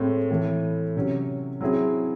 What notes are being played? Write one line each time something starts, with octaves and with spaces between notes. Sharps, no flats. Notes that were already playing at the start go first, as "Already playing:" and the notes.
Already playing: A2 G#3 C4
A2 E3 A3
C3 F#3 C#4
F#3 C4 E4 G#4